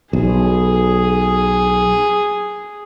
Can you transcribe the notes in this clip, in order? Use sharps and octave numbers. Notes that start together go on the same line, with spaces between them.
B1 G#4